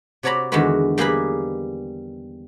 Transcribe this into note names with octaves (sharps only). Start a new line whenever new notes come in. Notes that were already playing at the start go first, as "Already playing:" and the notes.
C3 F#4 C#5 D5 A#5 B5
E2 D3 D#3 G#3 F#4 B4
G3 A#3 G4 G#4 B4 B5